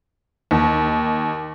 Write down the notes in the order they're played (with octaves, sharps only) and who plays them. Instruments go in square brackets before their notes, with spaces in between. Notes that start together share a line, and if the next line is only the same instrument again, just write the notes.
[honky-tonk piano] D#2